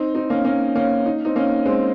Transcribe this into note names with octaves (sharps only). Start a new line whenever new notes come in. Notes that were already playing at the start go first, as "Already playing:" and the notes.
Already playing: C4 D#4
C4 D#4
A#3 C#4
A#3 C#4
A#3 C#4
D#4
C4 D#4
A#3 C#4
G#3 C4